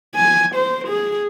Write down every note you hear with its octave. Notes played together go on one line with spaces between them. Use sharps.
G#5
C5
G#4